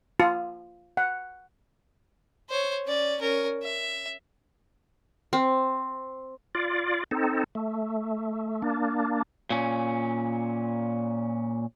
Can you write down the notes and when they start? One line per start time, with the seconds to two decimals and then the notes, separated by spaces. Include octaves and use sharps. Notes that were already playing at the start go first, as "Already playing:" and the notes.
0.20 F4
0.97 F#5
2.49 C5 C#5
2.86 C#4 D5
3.20 C#4 A#4
3.63 E5
5.33 C4
6.55 F4 D5
7.11 C4 D#4 A4
7.55 A3
8.62 A#3 D4
9.50 A#2 C#4